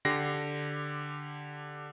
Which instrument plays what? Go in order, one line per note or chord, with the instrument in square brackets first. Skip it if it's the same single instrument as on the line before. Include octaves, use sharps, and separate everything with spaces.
[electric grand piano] D3 G4 A#6 C7